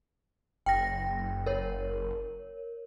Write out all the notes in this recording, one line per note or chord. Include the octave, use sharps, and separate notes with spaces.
F#1 G5 A#6
A#4 C#5